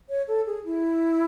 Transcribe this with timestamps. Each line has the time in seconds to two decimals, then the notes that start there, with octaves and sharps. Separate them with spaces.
0.09 C#5
0.28 A4
0.46 G#4
0.65 E4